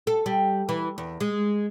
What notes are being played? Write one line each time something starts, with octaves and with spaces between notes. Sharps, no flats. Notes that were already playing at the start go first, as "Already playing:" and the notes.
A4
G3
E3
E2
G#3